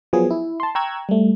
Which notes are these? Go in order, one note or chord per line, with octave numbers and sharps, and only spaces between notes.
F3 F#3 B3 G#4
E4
A5 C6
G5 A#5 C#6 E6 F#6 G#6
G3 A3